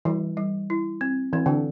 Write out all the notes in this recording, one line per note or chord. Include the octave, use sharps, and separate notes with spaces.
E3 G3
G3
E4
C4
E3 C4
D3